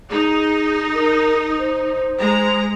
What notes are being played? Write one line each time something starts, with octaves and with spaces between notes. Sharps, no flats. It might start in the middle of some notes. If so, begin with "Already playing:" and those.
D#4 G#4
A#4
C5
G#3 A#5